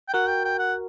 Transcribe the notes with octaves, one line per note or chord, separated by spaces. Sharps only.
G5
F#4 A#4 F#5
G5
G5
F#5